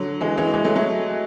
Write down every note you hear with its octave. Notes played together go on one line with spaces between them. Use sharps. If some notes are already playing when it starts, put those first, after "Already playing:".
Already playing: D3 F#3
E3 G#3
E3 G#3
E3 G#3
F#3 A3
F#3 A3